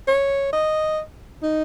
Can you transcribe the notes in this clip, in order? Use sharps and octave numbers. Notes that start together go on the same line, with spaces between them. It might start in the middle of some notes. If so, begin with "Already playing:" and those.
C#5
D#5
D#4